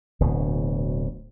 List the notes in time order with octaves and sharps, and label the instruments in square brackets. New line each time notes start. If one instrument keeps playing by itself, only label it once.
[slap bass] D1 D2 B2